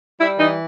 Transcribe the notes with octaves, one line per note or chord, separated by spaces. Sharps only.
G3 E4
E3 D#4